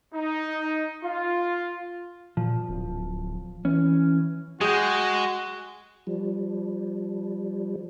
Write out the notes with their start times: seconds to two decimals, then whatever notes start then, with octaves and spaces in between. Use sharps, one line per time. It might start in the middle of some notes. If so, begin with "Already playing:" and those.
0.14 D#4
1.03 F4
2.37 A#2 F3
2.69 D1
3.65 E3 C#4
4.61 G#3 F#4 G#4 G5
6.07 F3 G3